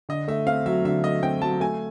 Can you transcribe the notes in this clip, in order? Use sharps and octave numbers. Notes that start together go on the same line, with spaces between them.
D3 D#5
A3 E5
C4 F5
F#3 E5
D3 E5
A3 D#5
C4 G5
F#3 A5
A3 G#5